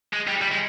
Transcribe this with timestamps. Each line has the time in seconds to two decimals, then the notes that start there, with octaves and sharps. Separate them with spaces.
0.13 G#3
0.27 G3
0.41 G3
0.51 G#3